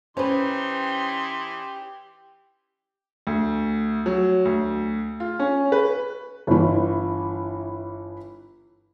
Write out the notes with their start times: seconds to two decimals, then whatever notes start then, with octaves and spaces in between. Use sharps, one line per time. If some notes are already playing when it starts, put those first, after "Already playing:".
0.17 E3 C#4 D#4 G4 B4 C5 C6
3.27 D2
4.06 F#3
4.45 D2
5.20 F4
5.39 C#4
5.72 B4
6.47 G1 E3